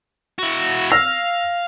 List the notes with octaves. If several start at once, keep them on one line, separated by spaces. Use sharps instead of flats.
E4 F#4
F5 E6 F6 A#6